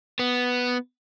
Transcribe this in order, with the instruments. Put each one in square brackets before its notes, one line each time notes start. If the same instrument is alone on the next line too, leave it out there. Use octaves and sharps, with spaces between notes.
[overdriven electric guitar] B3